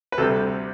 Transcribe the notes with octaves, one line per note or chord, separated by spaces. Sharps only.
B4
D2 C3 G3 A4